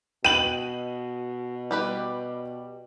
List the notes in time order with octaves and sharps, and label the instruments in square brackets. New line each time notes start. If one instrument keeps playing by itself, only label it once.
[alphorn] B2 [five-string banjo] B4 G5 [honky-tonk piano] D#7 F#7
[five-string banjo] G3 G4 B4